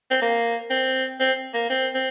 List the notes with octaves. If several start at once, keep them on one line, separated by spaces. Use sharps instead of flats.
C4
A#3
C4
C4
A#3
C4
C4